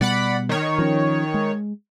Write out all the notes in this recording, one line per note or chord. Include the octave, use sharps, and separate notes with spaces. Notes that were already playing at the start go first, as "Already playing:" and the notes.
B2 G3 B3 D5 F#5 B5
D#3 C#5
F3 C#4
G#3